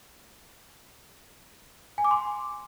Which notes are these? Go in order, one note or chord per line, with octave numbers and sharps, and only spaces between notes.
G#5
D6
C6